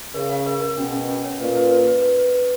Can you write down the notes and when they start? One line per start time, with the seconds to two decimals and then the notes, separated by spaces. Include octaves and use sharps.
0.14 C#3 A#4
0.30 F5
0.46 A#4
0.61 A#4
0.77 B2 C#4
0.93 C#4
1.09 C#4
1.24 C#5
1.40 A#2 B4
1.56 B4
1.71 B4
1.87 B4
2.02 B4
2.18 B4
2.34 B4